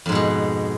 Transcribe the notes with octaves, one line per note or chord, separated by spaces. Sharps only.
F2 G#2 B2 G#3